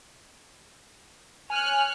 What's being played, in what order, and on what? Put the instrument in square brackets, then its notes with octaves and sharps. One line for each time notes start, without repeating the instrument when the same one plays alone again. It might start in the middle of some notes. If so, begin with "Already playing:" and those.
[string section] C#5 F6 F#6 [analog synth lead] G#5